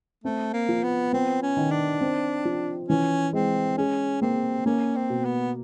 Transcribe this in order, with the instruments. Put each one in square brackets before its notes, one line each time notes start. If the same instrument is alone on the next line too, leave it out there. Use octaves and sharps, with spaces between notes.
[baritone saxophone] A3 [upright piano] C4
[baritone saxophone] A#3
[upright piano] F3
[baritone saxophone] B3
[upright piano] B3 [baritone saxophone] C4
[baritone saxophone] C#4
[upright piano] D#3
[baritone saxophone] D4
[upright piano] C4
F3
[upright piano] E3 [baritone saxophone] C#4
[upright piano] G#3 [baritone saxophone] C4
[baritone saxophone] C#4 [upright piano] G#4
[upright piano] A#3 [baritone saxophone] C4
[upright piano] A#3 [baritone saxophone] C#4
[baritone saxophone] C4
[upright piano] B2
[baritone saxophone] B3